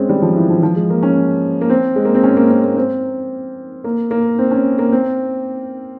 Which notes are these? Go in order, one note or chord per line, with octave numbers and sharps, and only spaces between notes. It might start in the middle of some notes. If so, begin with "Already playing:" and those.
Already playing: G#3 C4 C#4
G3
F3
E3
F3
F3
G#3
A#3
C#4
A#3
C4
G#3
A#3
C4
C#4
A#3
C4
A#3
C4
A#3
A#3
C4
C#4
A#3
C4